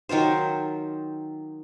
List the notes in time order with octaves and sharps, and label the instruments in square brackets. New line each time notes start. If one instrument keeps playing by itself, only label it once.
[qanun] D#3 F#3 F4 C5